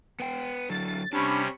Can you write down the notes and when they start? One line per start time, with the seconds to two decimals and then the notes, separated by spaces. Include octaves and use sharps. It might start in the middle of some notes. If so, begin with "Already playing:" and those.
0.20 B3 G5
0.70 D3 F#3 A6
1.13 C3 G3 C#4 D4 B5 C#6